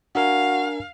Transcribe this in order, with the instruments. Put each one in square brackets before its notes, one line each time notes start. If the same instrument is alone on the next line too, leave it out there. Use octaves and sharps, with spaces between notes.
[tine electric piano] D4 A#4 G#5 [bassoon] F#4 [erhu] F5